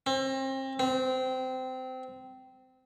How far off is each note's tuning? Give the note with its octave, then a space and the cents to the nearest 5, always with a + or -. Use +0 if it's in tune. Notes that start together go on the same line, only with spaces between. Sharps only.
C4 +35
C4 -20